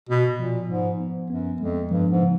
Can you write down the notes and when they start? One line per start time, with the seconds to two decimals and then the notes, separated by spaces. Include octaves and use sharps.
0.09 B2 B3
0.39 A#2 F3
0.69 G#2 F3
1.00 B3
1.30 F#2 B3
1.61 F2 G#3
1.91 G2 F3
2.11 G#2
2.21 C#3